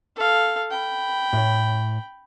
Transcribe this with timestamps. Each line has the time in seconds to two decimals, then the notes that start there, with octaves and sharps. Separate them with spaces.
0.16 A4 F5
0.70 G5 B5
1.33 A2 C#5